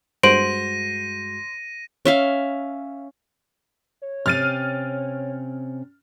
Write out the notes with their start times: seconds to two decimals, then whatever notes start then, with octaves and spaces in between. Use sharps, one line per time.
0.23 G2 G#3 F#4 C5 A#6 D7 D#7 F#7
2.05 C#4 E5 F5
4.02 C#5
4.26 C3 C4 C#4 F6 A6 D#7